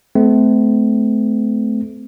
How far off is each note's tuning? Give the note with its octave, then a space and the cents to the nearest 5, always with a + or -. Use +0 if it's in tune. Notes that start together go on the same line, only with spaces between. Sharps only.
A3 -30 C4 -45